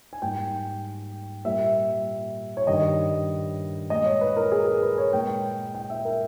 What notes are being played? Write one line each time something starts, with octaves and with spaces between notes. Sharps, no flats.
G#5
G#2 G3 A#3 G5
A#2 G3 A#3 E5
C#5
G2 D#3 G3 D#5
A#2 G#3 D#5
C#5
B4
A#4
G#4
B4
C#5
A#2 G#3 G5
G5
E5
A#4